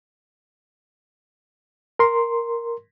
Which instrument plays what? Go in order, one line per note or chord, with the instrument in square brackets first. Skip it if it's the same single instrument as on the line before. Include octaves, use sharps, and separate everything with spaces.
[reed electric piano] A#4 C6